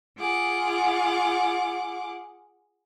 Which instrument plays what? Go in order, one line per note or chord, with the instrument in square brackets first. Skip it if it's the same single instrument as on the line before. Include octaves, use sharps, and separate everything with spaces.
[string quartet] F4 G#4 F#5 D6